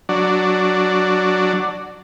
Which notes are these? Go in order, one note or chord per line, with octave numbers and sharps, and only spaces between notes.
F#3 D4